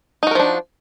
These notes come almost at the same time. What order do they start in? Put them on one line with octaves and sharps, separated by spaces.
D#4 F#4 A#4 F3 D4